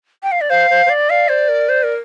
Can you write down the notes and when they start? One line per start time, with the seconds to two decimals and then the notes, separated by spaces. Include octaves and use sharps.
0.23 G5
0.32 F5
0.41 D5
0.50 C5 F5
0.70 C5
0.86 C5
0.89 D5
1.09 D5 F5
1.29 C5
1.48 A#4
1.69 C5
1.83 A#4